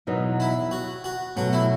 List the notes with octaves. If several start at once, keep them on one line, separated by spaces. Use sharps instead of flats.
E2 B2 F#3 B3 D#4
E4
F#4
F#4
B2 F#3 A3 F#4
E4